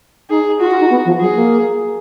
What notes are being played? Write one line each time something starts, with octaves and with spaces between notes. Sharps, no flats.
D#4 G#4
F4 F#4
F4
D#4
B3
F3
F#3 G#4
A#3